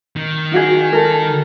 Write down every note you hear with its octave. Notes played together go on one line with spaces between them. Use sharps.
D#3
D#4 F#4 G#4
A4 A#4